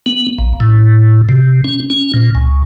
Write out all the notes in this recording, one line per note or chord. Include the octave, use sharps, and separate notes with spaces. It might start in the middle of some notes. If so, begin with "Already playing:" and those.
B3
A#1
A2
C3
C#4
C#4
A#2
C#2